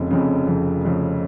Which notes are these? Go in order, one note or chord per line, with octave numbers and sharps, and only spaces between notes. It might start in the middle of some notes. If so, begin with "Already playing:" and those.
Already playing: F1 F2 C#3
F1 F2 C#3
F1 F2 C#3
F1 F2 C#3